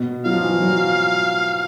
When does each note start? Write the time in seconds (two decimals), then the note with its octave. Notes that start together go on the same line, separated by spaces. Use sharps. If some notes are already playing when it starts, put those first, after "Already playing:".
Already playing: B2
0.25 F#3 F5
0.33 F3
0.42 E3
0.50 F3
0.62 F#3